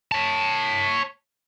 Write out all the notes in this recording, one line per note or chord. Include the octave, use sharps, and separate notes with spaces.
C#5 A5